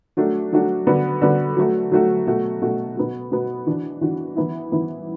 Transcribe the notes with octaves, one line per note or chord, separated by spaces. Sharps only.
F#3 A3 D4 F#4
F#3 A3 D4 F#4
D3 B3 F#4
D3 B3 F#4
F#3 A3 F#4
F#3 A3 F#4
B2 A3 F#4
B2 A3 F#4
B2 B3 F#4
B2 B3 F#4
E3 D4 F#4
E3 D4 F#4
E3 B3 E4
E3 B3 E4